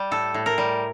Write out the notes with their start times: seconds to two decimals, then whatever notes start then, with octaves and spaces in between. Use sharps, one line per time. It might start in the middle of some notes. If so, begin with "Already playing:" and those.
Already playing: G3
0.11 A2 A4
0.34 A2
0.46 A#4
0.58 G3